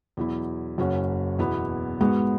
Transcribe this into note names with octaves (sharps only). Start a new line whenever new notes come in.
E2 B2 F#3 E4
F#1 F#2 F#3 C#4 F#4
E2 B2 B3 E4
G#2 G#3 B3 F#4